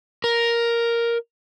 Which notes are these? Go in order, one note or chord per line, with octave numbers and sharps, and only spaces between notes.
A#4